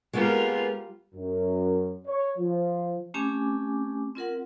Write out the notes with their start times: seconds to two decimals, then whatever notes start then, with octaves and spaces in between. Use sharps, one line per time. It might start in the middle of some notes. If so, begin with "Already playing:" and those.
0.13 G3 G#3 A#3 B3 F4 A#4
1.15 F#2
2.07 C#5
2.38 F3
3.14 A3 C4 C#4 G4 G#5 D6
4.15 C4 F4 A#4 F#5